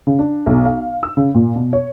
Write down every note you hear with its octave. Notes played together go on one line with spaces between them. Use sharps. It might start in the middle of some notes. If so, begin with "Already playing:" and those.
C#3
D4
B1
F5
E6
C#3
A#2
B2
C#5